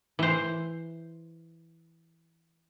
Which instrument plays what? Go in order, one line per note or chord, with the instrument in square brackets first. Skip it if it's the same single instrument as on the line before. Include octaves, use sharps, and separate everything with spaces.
[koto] E3 C5